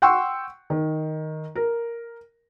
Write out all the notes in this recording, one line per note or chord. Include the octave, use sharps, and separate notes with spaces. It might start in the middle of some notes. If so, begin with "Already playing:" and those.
F#5 G5 C6 C#6 E6
D#3
A#4